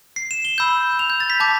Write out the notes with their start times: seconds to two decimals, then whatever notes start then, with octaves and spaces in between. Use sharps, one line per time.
0.16 C7
0.31 E7
0.45 G7
0.58 B5 E6 G6
0.99 F7
1.10 G6
1.20 A6
1.30 B6
1.40 A5 D6 G6